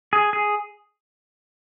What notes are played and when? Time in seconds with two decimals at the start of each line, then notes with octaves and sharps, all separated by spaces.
0.13 G#4
0.33 G#4